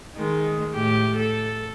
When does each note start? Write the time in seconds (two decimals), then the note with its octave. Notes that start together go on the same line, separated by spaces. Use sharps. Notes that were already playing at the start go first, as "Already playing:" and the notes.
0.15 D#3 G#3
0.73 A2 G4
1.16 A4